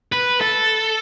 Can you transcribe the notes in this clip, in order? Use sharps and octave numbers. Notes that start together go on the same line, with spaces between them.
B4
A4